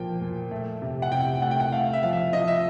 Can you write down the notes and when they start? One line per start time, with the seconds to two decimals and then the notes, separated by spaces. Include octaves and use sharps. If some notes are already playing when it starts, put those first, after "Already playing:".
Already playing: A#2 F3 A#3 G5
0.21 A#2
0.51 A3
0.82 C3
1.02 F#5
1.12 C3 G5
1.42 A3 F#5
1.51 G5
1.60 F#5
1.72 A3 F5
1.93 E5
2.03 F3 F5
2.13 E5
2.33 F3 D#5
2.48 E5